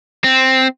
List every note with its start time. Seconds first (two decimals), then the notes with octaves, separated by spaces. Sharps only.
0.24 C4